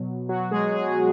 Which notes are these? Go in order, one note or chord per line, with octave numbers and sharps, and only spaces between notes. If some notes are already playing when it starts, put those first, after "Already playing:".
Already playing: B2 F#3
F#3 F#4
G#3 G#4
G#3 G#4